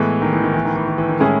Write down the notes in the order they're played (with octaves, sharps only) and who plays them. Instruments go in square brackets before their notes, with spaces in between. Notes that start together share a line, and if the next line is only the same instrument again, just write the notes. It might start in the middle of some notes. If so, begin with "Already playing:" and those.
Already playing: [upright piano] A2 G#3 B3 [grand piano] E3
[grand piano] D#3
E3
D#3
E3
D#3
E3
D#3
E3
D#3
[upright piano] A2 G#3 C#4 E4 G#4